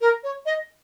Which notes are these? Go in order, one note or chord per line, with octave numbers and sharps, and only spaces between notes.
A#4
C#5
D#5